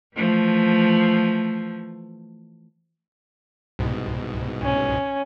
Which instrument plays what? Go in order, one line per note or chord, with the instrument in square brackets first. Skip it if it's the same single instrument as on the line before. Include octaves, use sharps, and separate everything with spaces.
[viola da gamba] E3 F3 A3
[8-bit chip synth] C2 G#2 B2
[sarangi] C#4